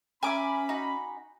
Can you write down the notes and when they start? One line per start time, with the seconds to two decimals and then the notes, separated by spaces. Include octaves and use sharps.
0.23 C#4 A#4 E5 G#5 B5 D6
0.69 D#4 F#4